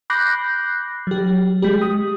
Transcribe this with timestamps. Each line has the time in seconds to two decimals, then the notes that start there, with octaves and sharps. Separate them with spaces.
0.10 B5 D6 F#6 G6 A#6 C7
1.07 F#3 G4
1.62 G#3 G4
1.82 D#6